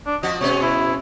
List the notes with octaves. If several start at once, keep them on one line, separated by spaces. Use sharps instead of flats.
D4
F3 F#4 D#5
B2 G#3 C#4 C#5
E4